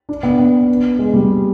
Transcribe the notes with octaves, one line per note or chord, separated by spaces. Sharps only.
D4
B3
B3
G#3
G3